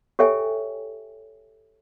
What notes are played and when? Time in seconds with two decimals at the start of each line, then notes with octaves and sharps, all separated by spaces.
0.19 G4 A4 C#5 E5 G5 G#5